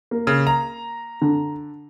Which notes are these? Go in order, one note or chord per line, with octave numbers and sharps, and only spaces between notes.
A#3
C#3
A#5
D3